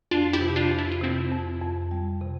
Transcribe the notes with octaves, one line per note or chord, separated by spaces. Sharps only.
F2 D4 F4
E4 G4
C3
D4 F4
F2
E4
F4
C3 C4 E4
F2
F2
G3
C3